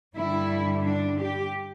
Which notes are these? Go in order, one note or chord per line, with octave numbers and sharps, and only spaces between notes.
G2 D3 G3 E4
D4
G4